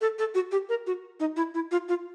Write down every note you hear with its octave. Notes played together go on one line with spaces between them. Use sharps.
A4
A4
F#4
G4
A#4
F#4
D#4
E4
E4
F4
F4